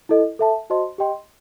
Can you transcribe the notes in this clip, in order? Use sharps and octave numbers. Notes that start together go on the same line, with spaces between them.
E4 A4 D#5
A4 E5 A5
F#4 C5 D#5 A5 C6
G4 D#5 G5 C6